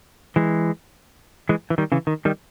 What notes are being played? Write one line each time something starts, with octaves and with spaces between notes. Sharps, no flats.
E3 G#3
E3 G#3
E3
D#3 G3
C#3 E3
D#3
D#3 G3